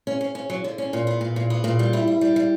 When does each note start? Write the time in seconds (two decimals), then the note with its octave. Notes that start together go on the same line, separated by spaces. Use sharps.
0.07 C#4
0.21 C#4
0.35 C#4
0.50 F#3
0.64 D3
0.78 C#4
0.93 A#2
1.07 B3
1.21 A#2
1.36 A#2
1.50 B3
1.64 A#2
1.79 G3
1.93 E4
2.07 E4
2.21 G3
2.36 G3